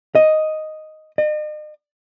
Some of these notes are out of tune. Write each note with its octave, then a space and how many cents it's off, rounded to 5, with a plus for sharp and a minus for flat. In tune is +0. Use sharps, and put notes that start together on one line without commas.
D#5 +0
D#5 -40